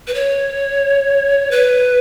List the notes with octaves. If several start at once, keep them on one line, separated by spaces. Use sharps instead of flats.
B4
C#5
B4